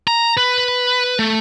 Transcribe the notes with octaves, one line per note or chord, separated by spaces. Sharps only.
A#5
B4
A3